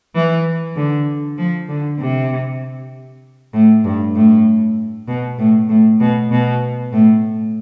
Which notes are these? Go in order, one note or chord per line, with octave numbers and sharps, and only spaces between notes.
E3
D3
F3
D3
C3
A2
G2
A2
B2
A2
A2
B2
B2
A2